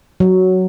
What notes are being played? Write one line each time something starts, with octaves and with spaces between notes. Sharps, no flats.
F#3